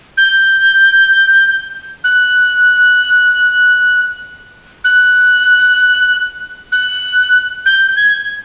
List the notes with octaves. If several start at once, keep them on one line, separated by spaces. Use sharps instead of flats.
G6
F#6
F#6
F#6
G6
G#6